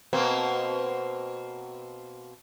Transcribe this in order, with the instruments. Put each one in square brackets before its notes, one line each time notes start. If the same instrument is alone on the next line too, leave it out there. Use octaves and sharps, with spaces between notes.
[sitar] B2 A#3 C4